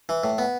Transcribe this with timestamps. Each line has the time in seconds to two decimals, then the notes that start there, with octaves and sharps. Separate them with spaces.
0.09 E3
0.24 A2
0.38 B3